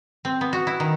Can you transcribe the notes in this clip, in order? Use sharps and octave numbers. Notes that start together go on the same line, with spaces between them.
C4
B3
F#4
E4
D#3